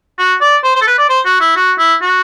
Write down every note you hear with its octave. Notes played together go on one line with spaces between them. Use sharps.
F#4
D5
C5
C5
A4
B4
D5
C5
F#4
E4
F#4
E4
F#4